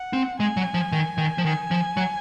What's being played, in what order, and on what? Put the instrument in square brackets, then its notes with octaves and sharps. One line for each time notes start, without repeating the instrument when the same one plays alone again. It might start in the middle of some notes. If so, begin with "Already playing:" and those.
Already playing: [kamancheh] F#5
[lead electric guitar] C4
[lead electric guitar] G#3 [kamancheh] G#5
[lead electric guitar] F#3
F3
D#3
D#3
F3
[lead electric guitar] D#3 [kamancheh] G#5
[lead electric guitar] F3
F#3